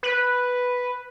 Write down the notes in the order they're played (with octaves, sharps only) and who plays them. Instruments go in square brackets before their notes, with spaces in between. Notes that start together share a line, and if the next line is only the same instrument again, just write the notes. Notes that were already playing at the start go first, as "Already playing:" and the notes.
[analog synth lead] B4